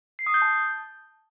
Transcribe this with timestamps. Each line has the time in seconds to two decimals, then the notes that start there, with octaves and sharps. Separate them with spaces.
0.19 C7
0.27 D#6
0.34 G6
0.42 A5